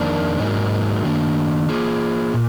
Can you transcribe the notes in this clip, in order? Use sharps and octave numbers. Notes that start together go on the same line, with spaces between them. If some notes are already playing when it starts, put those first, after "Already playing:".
Already playing: F2 D#3 A#3 D4
G#2 F#3 A#3 D#4
D#3 A#3 D4
A#3 F4 G#4
A#2